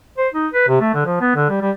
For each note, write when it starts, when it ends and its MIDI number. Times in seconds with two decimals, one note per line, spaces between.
0.18 0.28 72
0.34 0.47 63
0.53 0.64 71
0.68 0.80 48
0.81 0.90 57
0.94 1.05 50
1.06 1.18 53
1.21 1.34 59
1.35 1.46 50
1.49 1.61 55
1.62 1.71 55